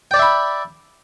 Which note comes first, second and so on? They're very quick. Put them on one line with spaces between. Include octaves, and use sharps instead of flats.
G5 D5 A5 E5 B5